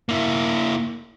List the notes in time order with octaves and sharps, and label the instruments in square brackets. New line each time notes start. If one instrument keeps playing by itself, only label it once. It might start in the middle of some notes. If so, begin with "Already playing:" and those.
[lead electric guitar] A#3 E4